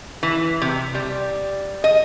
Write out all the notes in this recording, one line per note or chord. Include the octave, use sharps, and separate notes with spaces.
E3
C3
G3
D#5